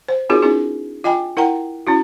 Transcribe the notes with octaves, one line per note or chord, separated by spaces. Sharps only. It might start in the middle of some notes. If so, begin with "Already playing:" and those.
C5
C4 D#4 F4 F#4 G#4 A#4
C4 D4 E4 G#4
F4 D#5 G5 G#5 B5
E4 A#4 F#5 G5 A#5
C#4 E4 F#4